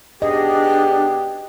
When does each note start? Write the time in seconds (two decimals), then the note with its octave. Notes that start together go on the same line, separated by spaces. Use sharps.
0.22 B2 B3 D4 G4 G#4 D#5